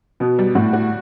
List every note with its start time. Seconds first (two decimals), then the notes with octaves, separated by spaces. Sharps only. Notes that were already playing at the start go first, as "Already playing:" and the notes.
0.20 B2 B3
0.39 G3
0.55 A2 F#4
0.73 F#4